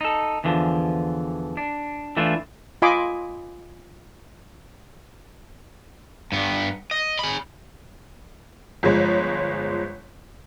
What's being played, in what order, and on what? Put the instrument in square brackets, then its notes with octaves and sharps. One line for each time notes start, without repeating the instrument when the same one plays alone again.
[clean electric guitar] D#4 A4
E2 D3 E3 F3
D4
E3 A3 D4 E4 F4
[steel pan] F4 D#5 G#5 B5 C6 D6
[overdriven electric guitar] G2 B3
D#5
G#4 B5
[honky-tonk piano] G1 F3 G#3 C#5